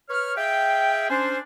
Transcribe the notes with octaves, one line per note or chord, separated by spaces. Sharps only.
B4 C#5 C#6 F6
G#4 E5 F5 G5
C#4 D4 C5